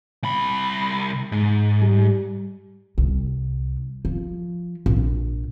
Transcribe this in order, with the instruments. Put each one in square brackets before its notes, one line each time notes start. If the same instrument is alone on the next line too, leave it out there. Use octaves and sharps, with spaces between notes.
[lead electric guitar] C2 B5
G#2
[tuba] G3
[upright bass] C2
F3
A#1